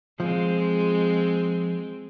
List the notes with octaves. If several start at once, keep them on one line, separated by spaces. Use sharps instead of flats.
F3 G#3 C4